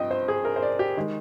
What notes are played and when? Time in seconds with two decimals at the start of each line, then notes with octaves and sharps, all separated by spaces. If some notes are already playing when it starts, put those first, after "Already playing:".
Already playing: G2 F3 C4 D#5 G5
0.11 C5
0.28 G#4
0.45 A#4
0.56 C5
0.62 D5
0.79 G4
0.97 D#3 G#3